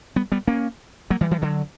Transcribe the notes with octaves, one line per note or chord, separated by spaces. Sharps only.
G3 B3
G3 B3
A#3 C#4
F#3 A#3
E3 G3
E3 G3
D3 F#3